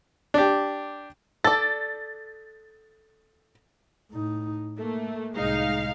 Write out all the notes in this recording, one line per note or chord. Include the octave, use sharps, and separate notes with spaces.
D4 G4
A4 D5 A6
A2 D#4
A3 A#3
C2 A2 G#3 D#4 F5